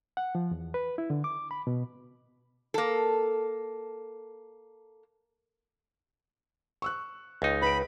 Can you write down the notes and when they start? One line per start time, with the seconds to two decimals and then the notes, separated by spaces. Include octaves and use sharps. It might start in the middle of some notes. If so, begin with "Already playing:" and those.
0.17 F#5
0.35 F3
0.51 E2
0.74 B4
0.98 E4
1.10 D3
1.24 D6
1.51 B5
1.67 B2
2.74 A#3 A4
6.82 C#6 E6 F#6
7.42 C#2 D#4
7.62 B4 B5 D7